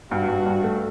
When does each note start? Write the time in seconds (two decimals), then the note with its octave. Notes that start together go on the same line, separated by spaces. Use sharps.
0.11 G2 F#4
0.29 G2
0.46 G2
0.64 A3